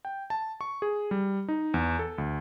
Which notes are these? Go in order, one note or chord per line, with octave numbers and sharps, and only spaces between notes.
G5
A5
C#6
G#4
G3
D#4
E2
A4
D2